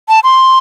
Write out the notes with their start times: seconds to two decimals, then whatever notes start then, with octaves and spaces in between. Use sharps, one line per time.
0.09 A5
0.24 C6